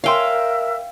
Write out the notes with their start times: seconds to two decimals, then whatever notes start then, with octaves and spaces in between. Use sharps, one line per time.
0.04 A#4 C#5 E5 F5 G5 G#5 C6